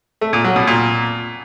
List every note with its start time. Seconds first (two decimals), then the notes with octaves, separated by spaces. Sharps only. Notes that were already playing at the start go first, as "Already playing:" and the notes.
0.21 A3
0.33 A#2
0.44 F#3
0.56 B2
0.67 A#2